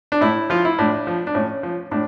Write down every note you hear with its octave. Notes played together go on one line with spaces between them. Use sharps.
D4
A2 E4
F3 F4
E4
A2 D4
F3
D4
A2 C#4
F3
A2 D4